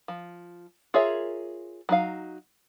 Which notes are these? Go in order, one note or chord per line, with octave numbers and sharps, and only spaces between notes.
F3
F4 G#4 A#4 C#5 E5
F#3 D#4 F5